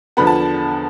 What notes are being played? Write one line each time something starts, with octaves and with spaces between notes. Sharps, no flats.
E2 D3 F3 B3 B5
A5